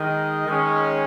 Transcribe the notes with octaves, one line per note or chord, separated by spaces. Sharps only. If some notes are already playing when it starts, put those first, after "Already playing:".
Already playing: D#3 G#3 D#4 D#5
D#3 G#3 C#4